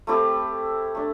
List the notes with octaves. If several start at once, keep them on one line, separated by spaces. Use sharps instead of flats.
A3 C4 E4 G4
A3 D4